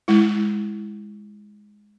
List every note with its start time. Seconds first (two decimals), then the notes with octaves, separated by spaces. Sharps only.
0.08 G#3 E4